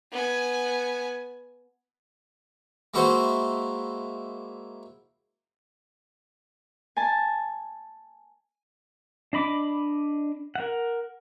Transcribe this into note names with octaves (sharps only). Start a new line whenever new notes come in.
B3 G#5
G#3 A#3 E4 F#4 C5
G#5 A5
D4 D#5 B5 D6
A#4 F#5